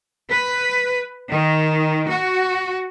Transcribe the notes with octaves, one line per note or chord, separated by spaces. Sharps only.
B4
D#3
F#4